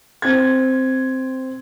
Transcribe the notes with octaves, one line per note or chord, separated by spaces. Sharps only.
C4 G#6